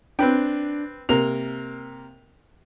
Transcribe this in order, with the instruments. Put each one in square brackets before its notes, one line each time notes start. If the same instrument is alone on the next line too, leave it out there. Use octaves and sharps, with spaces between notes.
[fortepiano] C4 B4 G5 [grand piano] D4
[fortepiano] C3 A#3 A#4 [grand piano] F7